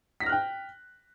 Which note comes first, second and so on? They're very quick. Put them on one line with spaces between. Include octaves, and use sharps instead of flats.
B6 A#6 F6 F#6 G5